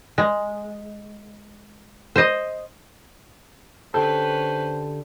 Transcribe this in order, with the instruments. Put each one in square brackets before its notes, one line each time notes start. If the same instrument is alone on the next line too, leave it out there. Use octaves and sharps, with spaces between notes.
[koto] G#3
C5 D#5
[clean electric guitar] D3 G4 A4 [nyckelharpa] C#4 B4 [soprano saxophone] C5